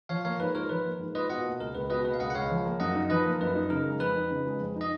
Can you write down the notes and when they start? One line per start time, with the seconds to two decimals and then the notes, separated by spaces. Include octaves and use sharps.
0.09 F3 C#5 F5
0.25 A#3 C#5 F5
0.39 G#2 B4
0.55 F4 A#4 C#5
0.69 F3 B4
0.85 A#3
0.99 G#2
1.15 F4 B4 D#5
1.29 B2 D#5 F#5
1.45 A#3
1.60 C#2 A#4
1.75 C#2 B4
1.90 B2 B4 D#5
2.05 A#3 B4
2.14 F5
2.20 C#2 D#5 F#5
2.30 F#5
2.35 C#2 C#5 F5
2.50 F3
2.65 A#3
2.80 F#2 D#5 F#5
2.95 D#4
3.10 F3 B4 D#5
3.25 A#3
3.41 F#2 B4
3.55 D#4
3.70 C#3 A#4
3.86 G#3
4.00 F2 B4
4.15 D#4
4.31 C#3
4.46 G#3
4.60 F2
4.76 D#4
4.81 D#5